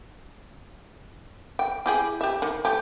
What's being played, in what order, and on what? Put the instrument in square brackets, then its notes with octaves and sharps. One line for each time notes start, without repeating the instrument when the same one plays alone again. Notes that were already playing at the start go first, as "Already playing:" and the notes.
[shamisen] G5
E4 G4 G#4
G4 E5
D#3
A3 G4